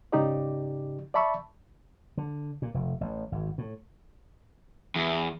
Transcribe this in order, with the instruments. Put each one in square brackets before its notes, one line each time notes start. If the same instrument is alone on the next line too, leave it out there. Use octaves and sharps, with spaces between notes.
[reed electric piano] G#2 C#3 D#4 G4 D5
D5 E5 A5 B5 C#6 E6
[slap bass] D3
A#2
F1
A1
G#1
A2
[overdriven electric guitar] E2